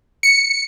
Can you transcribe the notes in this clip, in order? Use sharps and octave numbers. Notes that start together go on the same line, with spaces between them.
C#7